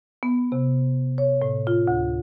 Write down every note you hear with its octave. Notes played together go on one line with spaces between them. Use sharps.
B3
C3
C#5
A2
F4
D2